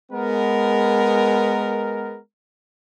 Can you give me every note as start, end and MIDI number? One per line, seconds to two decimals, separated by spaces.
0.12 2.19 56
0.12 2.19 59
0.12 2.19 70